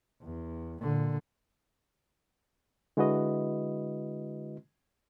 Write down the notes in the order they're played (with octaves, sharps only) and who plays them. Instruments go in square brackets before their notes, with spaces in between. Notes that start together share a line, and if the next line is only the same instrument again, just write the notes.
[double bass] E2
A#2 D3
[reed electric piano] D3 G#3 E4 F#4 B4 D#5